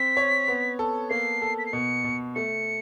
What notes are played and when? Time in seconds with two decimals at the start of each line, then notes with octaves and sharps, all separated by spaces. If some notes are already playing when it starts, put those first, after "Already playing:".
Already playing: C4 C5 B6
0.17 C#5
0.48 B3
0.79 A4
1.10 A#3 C7
1.42 A4
1.58 B6
1.66 C7
1.73 B2 C#7
2.04 B2
2.35 A3 C#7